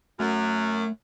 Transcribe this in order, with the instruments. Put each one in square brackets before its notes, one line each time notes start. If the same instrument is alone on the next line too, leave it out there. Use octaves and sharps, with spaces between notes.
[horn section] F#2 [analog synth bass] A3